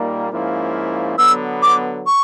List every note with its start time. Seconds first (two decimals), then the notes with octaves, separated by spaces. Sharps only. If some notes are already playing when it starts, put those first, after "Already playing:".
Already playing: A#2 G3 A#3 D#4
0.31 G#2 F3 A#3 C#4 E4
1.18 D3 F#3 B3 E6
1.62 D6
2.06 C#6